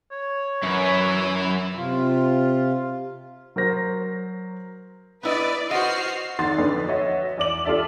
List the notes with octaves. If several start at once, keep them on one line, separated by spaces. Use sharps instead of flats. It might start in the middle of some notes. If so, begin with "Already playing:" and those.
C#5
F#2 E4 B4
C3 F4
F#3 A#4 C5 A#6
B3 E4 B4 D5 D#5
F#4 C5 D#5 F6 C7
F1 D#3 F#5 C6 A6
F2 D3 B4
F#4 C#5 D#5 E5
E2 D5 D6 F#7
F4 G4 A4 D5 E5